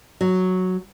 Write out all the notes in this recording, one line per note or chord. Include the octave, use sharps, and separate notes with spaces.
F#3